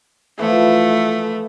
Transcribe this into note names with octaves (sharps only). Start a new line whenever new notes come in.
E3 F3 A3